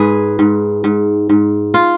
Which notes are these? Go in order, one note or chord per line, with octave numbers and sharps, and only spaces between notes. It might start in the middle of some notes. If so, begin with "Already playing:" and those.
Already playing: G#2 G#4 B4
G#2
G#2
G#2
F4